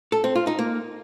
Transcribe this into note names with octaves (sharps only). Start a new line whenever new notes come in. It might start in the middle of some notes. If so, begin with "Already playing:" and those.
A4
C4
F4
D#4
A#3